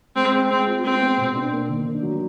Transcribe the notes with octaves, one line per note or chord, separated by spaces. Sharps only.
G#3 C4
G#3
G#3 C4
F4
G#3 C4
B3
B2
D4
A#3
D#3
D4
F#3